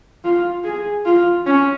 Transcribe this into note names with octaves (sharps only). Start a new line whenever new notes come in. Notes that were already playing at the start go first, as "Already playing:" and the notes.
F4
G#4
F4
C#4